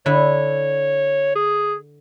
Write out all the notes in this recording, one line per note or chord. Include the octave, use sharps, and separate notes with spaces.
D3 E4 C#5
G#4